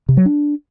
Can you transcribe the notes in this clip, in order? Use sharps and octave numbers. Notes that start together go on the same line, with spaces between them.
C3
F#3
D4